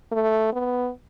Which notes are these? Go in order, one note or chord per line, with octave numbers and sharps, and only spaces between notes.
A3
B3